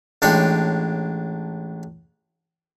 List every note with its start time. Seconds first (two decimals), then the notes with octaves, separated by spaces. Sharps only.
0.22 A1 G#3 D4 C#5 G5 G#5